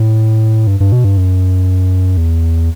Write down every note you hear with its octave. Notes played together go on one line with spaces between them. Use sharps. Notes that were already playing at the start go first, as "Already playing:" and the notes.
Already playing: A2
G2
G2
B2
G2
F#2
E2